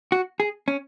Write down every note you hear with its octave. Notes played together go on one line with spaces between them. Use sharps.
F#4
G#4
C#4